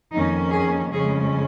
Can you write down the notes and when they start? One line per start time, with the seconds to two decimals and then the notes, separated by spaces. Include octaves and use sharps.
0.13 F2 D#3 A#3 C#4 D#4
0.52 G#4
0.91 F2 C#3 G#3 C#4 G#4